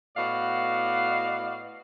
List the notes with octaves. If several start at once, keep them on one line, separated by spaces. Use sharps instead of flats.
A2 B3 F#4 D5 D#5 F5